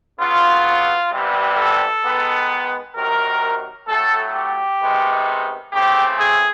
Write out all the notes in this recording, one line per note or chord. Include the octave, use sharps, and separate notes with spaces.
C#3 F#3 B3 F4
C3 E3 G3 B3
A4
D#3 G#3 B3
C3 D#3 F#3 A#4
A2 F#3 A3 A4
G4
C3 D#3 G#3 B3
C#3 E3 A3 C4 G4
G#4